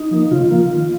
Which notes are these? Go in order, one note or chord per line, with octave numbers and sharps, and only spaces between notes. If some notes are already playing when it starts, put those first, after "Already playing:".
Already playing: D#4
F3 A#3
C#3 F4
F3 A#3
D#3